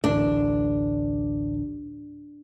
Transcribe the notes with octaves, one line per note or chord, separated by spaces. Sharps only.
A1 D2 D4